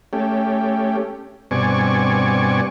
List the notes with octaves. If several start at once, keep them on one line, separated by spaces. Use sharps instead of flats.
A3 C#4 G4
G2 B2 C4 D5 G#5 C#6